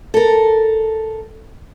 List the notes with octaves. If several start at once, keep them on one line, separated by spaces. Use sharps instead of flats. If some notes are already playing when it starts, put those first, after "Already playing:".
A4 A#4